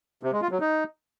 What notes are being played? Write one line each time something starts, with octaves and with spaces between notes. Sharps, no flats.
C3
G#3
F4
F#3
D#4